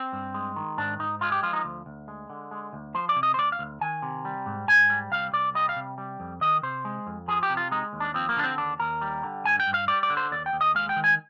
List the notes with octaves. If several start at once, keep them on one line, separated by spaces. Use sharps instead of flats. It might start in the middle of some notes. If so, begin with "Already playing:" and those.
Already playing: C4
G2
G#3
D#3
G#2 D4
G#2 D#4
G#3 F4
G4
F3 F4
D#4
D2
D2
G#3
D3
G#3
D2
F3 C5
D5
C3
D#5
C5
D2 D5
F5
D2
D#3 G#5
C3
G3
G#2
G#2 G#5
G3
C2 F5
C2 D5
G3 D#5
F5
C3
G3
F2
D#3 D#5
C3 C5
G#3
F2
F3 G#4
G4
C3
F4
G#3 D#4
D#2
D4
F3 C4
A#3
D3 D4
C4
D#2 D4
D#2 A#4
G3
D3
G2 G#5
G5
G2
F5
G3 D5
D5
D3
C5
D#2 D5
G5
D#2
D#5
G#3 F5
G5
D#3
G#5